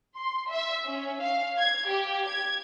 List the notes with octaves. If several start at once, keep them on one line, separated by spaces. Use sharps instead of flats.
C6
E5
C#4
F5
G#6
G4
G#6